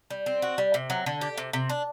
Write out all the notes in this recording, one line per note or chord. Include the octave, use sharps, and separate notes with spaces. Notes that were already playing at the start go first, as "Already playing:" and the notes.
G3
C4
F#4
G3
C3
F#3
D3
G4
C3
C3
D4